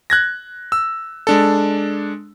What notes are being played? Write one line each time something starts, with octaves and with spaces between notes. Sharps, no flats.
F#6 G#6 A#6
E6
G#3 D4 A4